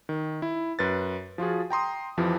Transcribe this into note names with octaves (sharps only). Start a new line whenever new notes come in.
D#3
E4
F#2 B4 A6
F3 F4 F#4 G#4
G5 A#5 C6 D#6
F2 E3 F3 G4